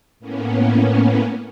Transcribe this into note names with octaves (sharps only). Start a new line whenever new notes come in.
A2 A#3 B3 C#4